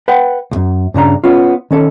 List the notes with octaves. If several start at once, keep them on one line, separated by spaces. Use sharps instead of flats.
B4 F#5 G5
C2 F#2
G2 C#3 D4 A#5
B3 C#4 F4
D#3 C#4 A4